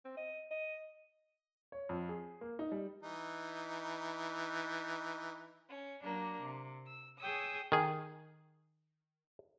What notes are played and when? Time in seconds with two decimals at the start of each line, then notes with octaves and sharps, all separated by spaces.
0.05 C4
0.17 D#5
0.51 D#5
1.72 C#5
1.89 F2
2.09 G#4
2.41 A#3
2.59 D#4
2.72 G3
3.03 E3 D#4
5.69 C#4
6.01 F#3 A#3 D4
6.42 C3
6.87 E6
7.19 G#4 C#5 G5 D#6 E6
7.72 D#3 G#4